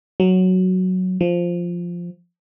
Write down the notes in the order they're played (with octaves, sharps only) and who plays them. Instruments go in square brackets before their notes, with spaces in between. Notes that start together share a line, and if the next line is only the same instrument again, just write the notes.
[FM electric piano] F#3
F3